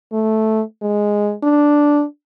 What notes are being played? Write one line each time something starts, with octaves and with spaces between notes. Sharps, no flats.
A3
G#3
D4